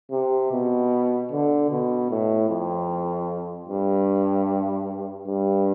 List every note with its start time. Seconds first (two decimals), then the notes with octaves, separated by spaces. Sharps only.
0.11 C3
0.52 B2
1.31 D3
1.71 B2
2.10 A2
2.49 F2
3.68 G2
5.28 G2